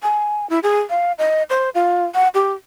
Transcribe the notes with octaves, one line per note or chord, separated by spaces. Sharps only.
G#5
E4
G#4
F5
D#5
C5
F4
F#5
G4